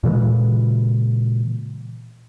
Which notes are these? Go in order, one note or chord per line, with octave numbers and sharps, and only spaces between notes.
A#2 C#3 E3 G#3